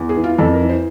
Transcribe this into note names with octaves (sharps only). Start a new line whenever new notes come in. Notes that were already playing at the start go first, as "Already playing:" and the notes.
Already playing: E2
G#4
E3
F4
F2 A4
A#4
E3
C5